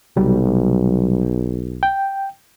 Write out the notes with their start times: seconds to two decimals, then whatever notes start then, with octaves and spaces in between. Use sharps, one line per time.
0.17 B1 C3 F#3 G3
1.83 G5